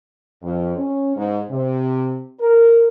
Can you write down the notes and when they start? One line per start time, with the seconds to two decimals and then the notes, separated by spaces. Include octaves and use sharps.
0.42 F2
0.77 C#4
1.17 G#2
1.51 C3
2.40 A#4